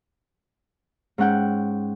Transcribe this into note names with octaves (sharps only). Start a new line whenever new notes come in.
G#2 C#4 F#5 G5